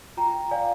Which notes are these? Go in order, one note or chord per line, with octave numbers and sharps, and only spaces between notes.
F4 G5 A#5
D5 F5 G#5